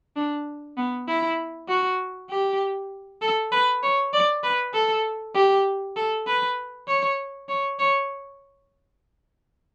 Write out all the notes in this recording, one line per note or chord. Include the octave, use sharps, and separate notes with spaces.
D4
B3
E4
F#4
G4
A4
B4
C#5
D5
B4
A4
G4
A4
B4
C#5
C#5
C#5